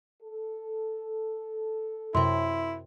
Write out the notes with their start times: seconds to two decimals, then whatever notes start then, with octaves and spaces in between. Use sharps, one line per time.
0.22 A4
2.15 F#2 C3 E4 C6